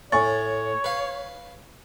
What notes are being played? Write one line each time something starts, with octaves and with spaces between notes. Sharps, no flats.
A2 C#5 G#5 C#6 A6
B4 F5